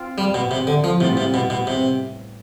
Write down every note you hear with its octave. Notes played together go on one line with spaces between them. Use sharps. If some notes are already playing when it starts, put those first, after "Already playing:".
Already playing: C4 F4
G3
B2
C3
D3
F3
A2 C3 G3 B3 F4
C3
B2
B2
C3